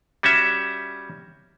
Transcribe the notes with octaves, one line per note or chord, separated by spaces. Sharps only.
G3 C#4 F#4 E5